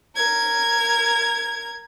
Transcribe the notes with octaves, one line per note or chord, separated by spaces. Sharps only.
A#4 G#6